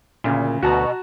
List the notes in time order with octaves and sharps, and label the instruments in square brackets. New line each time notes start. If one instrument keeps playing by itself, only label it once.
[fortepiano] D2 C#3 [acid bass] A#2
[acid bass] D2 [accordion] B2 [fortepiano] F#4 A5 A#5